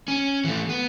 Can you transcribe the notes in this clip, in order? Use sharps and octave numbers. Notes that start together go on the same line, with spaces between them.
C#4
E3 A3
B3